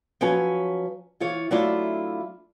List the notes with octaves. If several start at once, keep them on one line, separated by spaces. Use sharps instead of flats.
F3 F#3 C#4 B4 G#5
E3 F4 C#5
F#3 A3 D4 E4 F4 E5